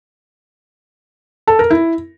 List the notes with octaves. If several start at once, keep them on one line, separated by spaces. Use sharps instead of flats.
A4
A#4
E4